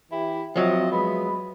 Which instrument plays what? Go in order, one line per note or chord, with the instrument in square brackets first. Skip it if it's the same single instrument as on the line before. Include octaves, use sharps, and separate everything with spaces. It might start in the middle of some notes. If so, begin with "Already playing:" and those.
[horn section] E3 E4 G4
[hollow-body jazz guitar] F3 F#3 [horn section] C4 D#5 E5
[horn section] G#3 B3 B5